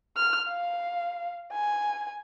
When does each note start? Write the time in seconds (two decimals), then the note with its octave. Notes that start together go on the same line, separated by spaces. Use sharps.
0.17 F6
0.48 F5
1.52 G#5